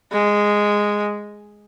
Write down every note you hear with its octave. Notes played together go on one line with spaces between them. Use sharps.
G#3